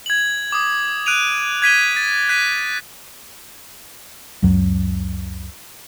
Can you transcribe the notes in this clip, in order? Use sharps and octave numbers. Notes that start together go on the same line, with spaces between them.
G#6 F#7
D6 D#6
F#6 D7 D#7 F7
G#6 B6 D#7 G7
A6
F#6 G#6 B6 D#7
C#2 F#2 F#3